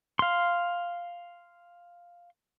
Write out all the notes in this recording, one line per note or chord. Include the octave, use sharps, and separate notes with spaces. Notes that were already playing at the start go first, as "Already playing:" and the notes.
F5 C6